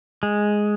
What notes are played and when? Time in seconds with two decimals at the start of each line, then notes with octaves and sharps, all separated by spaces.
0.23 G#3